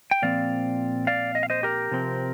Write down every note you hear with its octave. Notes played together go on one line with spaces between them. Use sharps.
G5
A#2 F3 C4 D5 F5
D5 F5
D#5
F5
C5 D#5
G4 A#4
C3 F3 C4